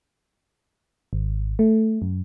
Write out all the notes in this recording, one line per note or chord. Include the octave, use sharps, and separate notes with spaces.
G#1
A3
F#2